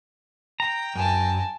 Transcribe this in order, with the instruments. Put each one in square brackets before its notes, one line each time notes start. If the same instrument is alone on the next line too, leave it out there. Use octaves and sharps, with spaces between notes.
[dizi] G5 [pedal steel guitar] A#5
[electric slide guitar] F#2 [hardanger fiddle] G#5 A5